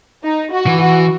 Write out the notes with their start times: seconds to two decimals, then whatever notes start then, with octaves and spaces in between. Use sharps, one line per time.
0.24 D#4
0.52 F#4
0.67 E3
0.81 F#4